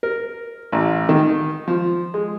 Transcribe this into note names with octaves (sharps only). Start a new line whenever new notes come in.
A#4
A1
D#3
F3
G#3